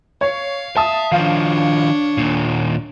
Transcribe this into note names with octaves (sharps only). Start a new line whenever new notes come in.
C#5 F5
E5 A5 D#6
D#3 F3 D4 C#5 F5
D#2 A#2